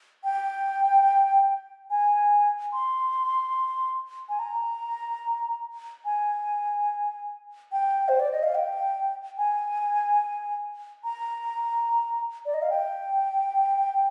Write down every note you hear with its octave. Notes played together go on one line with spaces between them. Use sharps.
G5
G#5
C6
G#5
A#5
G#5
G5
C5
D5
D#5
F5
G5
G#5
A#5
D5
D#5
F5
G5